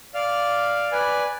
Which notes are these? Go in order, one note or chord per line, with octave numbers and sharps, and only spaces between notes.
D5 F5 F6
B4 D5 G#5